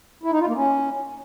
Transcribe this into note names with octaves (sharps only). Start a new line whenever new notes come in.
E4
D#4
F4
A#3
C#4